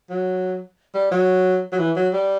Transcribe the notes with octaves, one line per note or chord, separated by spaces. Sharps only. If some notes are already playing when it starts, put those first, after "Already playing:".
F#3
G3
F#3
F#3
E3
F#3
G3